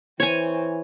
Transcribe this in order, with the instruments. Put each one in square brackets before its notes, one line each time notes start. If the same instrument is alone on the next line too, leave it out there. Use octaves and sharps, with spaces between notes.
[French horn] E3 [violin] C4 [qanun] C#5 G#5